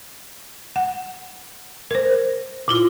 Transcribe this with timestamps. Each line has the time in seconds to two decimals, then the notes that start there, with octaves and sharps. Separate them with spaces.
0.76 F#5
1.91 A#4 C5
2.68 A#2 E4 F4